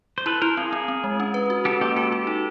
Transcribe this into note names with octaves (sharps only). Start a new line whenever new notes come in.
C5
E4 A4 B4
E4 A#4 C5
C4 G#4 A#4
C4
C4
G#3
C#4
B4
F#4
C#4 G4 A4
A#3 G4 A4
F#4 G4 A4
F#4 G4 A4
D#4